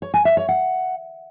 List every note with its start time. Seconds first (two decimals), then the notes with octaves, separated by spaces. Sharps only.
0.02 C#5
0.14 G#5
0.25 E5
0.37 C#5
0.49 F#5